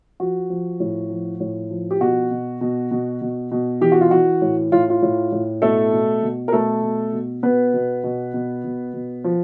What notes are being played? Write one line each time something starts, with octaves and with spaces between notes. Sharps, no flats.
F3 F#4
F3
A2
F3
A2
F3
G4
B2 F#4
B2
B2
B2
B2
B2
E3 G4
F#4
F4
E3 F#4
A2
A2 F4
F4
A2
A2
B2 A3 A4
B2
B2
A#4
B2 A3 A4
B2
B2
B2 B3 B4
B2
B2
B2
B2
B2
F3